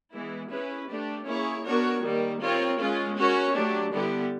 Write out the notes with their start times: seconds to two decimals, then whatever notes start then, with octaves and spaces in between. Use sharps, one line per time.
0.13 E3 G#3 B3 E4
0.51 C#4 E4 G#4 B4
0.89 A3 D4 G4
1.27 A#3 C#4 E4 G#4 C#5
1.64 B3 D4 F#4 A#4 C#5
2.03 D#3 G3 A#3
2.41 C4 F4 A#4 C#5
2.79 G#3 C#4 F4
3.17 C#4 F#4 A#4 C#5
3.54 F#3 A3 D4 G4
3.92 D3 G3 B3 E4 G4